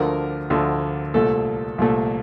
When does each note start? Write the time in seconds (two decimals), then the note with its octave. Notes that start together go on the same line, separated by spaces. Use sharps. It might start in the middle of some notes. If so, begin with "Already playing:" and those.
Already playing: D2 D3 F3 A3 A#4
0.50 D2 D3 F3 A3
1.14 C2 A#2 A3 A4
1.78 C2 A#2 A3